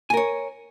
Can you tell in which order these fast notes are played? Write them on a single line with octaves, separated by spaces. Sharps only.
G#5 A#4 C#5